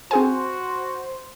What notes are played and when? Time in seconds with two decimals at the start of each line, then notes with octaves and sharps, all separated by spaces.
0.11 C4 F#4 G#4 C5 G#5